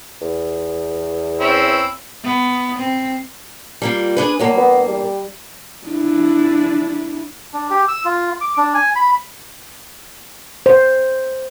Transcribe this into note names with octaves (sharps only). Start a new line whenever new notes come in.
E2
C4 C#4 E4
B3
C4
G3 A#3 F4
D4 G#4 B4
E2 G2 F#3 A#3
B3
G3
D4 E4
D4
G4
E6
F4
D6
D4
G#5
B5
C5